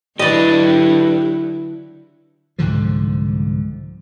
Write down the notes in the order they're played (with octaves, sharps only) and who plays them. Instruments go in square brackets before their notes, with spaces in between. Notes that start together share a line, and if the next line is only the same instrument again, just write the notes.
[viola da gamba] D3 F#3 E4 [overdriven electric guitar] G4 B4 [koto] D5 D#5
[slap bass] C2 G#2 D3 F3